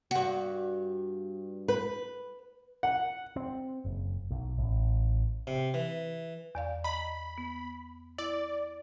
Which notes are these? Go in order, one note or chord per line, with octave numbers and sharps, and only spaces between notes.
G2 F#4
B4
F#5
C4
F#1
B1
A1
C3
E3
E2 D5 F5
D#5 A#5 B5
B3
E4 D5